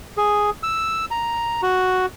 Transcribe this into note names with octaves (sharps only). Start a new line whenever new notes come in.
G#4
E6
A#5
F#4